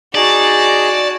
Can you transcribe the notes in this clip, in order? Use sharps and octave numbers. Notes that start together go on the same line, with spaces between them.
D#4 F#4 G#4 D5 A5